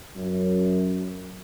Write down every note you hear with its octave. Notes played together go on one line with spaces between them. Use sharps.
F#2